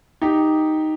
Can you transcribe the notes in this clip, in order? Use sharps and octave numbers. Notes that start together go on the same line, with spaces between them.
D#4 G4